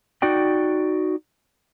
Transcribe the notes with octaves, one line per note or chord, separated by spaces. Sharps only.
D#4 F#4 D5 G5